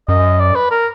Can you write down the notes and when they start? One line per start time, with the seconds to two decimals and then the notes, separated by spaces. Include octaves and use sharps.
0.09 F#2 D#5
0.40 D5
0.56 B4
0.71 A#4